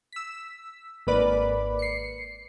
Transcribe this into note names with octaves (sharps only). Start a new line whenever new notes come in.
E6 B6
G#1 A#3 B4 D5
C7 C#7